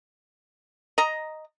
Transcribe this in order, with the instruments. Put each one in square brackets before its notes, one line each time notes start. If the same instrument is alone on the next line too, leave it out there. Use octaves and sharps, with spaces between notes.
[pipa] D#5 A#5